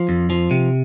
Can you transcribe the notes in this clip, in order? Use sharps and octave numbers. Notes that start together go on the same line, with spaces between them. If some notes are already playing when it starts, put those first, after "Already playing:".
Already playing: F3
F2
F3
C3